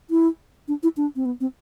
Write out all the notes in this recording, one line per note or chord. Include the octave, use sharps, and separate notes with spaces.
E4
D4
E4
D4
C4
B3
C4